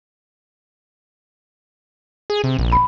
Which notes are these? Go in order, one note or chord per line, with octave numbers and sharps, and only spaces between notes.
G#4
C3
A#1
B5